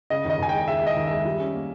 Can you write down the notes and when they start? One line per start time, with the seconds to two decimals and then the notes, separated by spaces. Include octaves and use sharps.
0.10 C#3 D#5
0.25 D#2
0.30 D#5
0.39 D#2 G#5
0.49 G#3 G5
0.68 G#3 E5
0.82 G#3 D#5
0.97 D#2
1.07 G#3 E5
1.25 G3
1.40 C#4
1.54 A#3